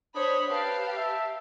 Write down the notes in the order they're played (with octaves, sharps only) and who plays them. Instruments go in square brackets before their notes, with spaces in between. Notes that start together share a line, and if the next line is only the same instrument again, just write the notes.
[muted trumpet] D4 [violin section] C5 C#5 B5 [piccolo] D#6
[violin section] G4 F5 [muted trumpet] B4 [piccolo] A5
[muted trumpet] E5 [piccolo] A5